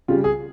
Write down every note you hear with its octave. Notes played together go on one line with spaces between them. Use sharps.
C#3 G3 F4
G#4